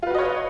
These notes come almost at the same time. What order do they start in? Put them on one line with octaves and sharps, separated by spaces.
F4 B4 F#4 D#5 C#5